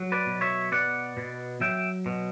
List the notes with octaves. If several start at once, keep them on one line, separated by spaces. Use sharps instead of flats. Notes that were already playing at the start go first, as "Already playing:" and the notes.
Already playing: F#3
B4 D5
B2
C#5 E5
B3 D5 F#5
B2
F#3 E5 G5
B2